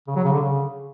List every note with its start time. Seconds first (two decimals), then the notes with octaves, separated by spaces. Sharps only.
0.07 C#3
0.16 F#3
0.24 C#3
0.32 D3
0.41 C#3